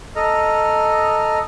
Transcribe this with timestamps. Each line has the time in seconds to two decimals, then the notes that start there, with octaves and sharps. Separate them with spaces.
0.16 A4 D#5 A#5 F6